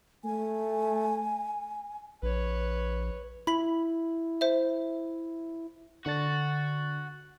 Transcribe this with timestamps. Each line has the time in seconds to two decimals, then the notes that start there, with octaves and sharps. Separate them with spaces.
0.24 A3 G#5
2.22 A#1 B4 C#5
3.47 E4 B5 B6 F#7
4.41 C5 E5
6.06 D3 D4 F#4 A6